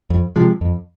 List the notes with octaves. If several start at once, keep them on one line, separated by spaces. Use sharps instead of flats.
F2
C3 F3 G#3
F2